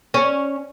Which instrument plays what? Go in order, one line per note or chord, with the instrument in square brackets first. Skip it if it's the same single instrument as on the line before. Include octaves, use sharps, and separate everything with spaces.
[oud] C#4